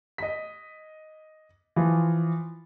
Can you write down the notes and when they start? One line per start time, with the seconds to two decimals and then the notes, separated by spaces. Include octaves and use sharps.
0.18 D#5 B6
1.76 E3 F3 F4